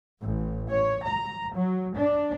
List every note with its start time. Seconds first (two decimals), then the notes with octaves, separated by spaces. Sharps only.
0.19 A1
0.68 C#5
1.06 A#5
1.52 F#3
1.96 D4